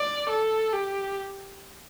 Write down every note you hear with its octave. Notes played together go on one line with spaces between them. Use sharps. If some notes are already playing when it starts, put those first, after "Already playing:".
Already playing: D5
A4
G4